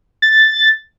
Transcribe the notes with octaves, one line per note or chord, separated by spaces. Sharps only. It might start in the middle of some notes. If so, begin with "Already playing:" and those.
A6